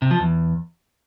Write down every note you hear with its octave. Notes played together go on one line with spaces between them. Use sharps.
C3
F3
E2